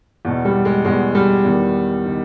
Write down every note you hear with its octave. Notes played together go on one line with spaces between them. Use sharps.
E2 B2
G3
G#3
E2 B2 G#3
G3
E2 D#3
D#3